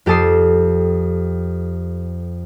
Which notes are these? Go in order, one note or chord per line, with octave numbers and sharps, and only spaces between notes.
F2 G4 A4 A5 D#6 C7